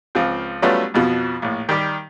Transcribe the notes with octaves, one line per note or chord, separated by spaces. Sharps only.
C#2 F3 C4
F#3 G3 A3 B3 C#4 F4
F2 B2 F3
A#1 A2
D#3 G3 G4